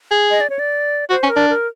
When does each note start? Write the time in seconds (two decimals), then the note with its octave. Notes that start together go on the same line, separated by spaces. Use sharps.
0.11 G#4
0.31 D#5
0.41 D5
0.50 C#5
0.59 D5
1.10 F#4 C5
1.23 C#4
1.29 A#4
1.37 D4
1.50 A#4